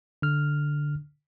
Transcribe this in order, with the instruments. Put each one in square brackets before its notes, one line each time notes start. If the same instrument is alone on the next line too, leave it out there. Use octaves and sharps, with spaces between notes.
[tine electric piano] D3 F6